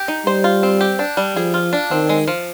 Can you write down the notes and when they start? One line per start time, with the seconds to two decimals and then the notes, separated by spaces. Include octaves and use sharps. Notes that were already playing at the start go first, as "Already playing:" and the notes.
Already playing: G4
0.08 D#4
0.26 G3 C5
0.44 F4
0.63 C4
0.81 G4
0.99 D4
1.17 G3
1.36 F3 G#4
1.54 F4
1.73 D4
1.90 D#3 C4
2.09 G#3
2.28 F3